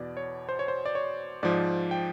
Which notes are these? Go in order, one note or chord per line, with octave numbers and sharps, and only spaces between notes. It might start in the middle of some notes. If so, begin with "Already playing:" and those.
Already playing: E2 B2 D5
C#5
C5
C#5
C5
D5
C#5
G#2 F3 D5
G5